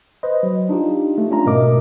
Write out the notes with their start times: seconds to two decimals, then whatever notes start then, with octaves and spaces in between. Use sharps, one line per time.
0.23 B4 C5 D#5
0.43 F#3
0.69 D4 D#4 F4 G4
1.18 A3
1.30 C#4 D4 F4 A#5
1.45 G#2 B2 A3 A#4 D#5 D6